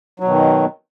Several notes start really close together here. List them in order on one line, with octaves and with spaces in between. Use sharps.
F#3 B2 D#3